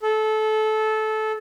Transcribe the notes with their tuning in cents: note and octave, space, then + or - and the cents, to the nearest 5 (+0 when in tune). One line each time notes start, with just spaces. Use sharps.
A4 -20